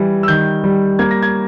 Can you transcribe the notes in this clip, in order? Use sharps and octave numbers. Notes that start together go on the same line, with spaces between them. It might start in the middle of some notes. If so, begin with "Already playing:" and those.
Already playing: E3 G3
E6
D#3 G6
G3
A#3 G#6
A#6
G#6